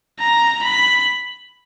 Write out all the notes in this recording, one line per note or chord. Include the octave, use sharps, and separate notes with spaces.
A#5
B5